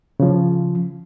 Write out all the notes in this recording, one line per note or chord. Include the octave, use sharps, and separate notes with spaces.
C#3 F3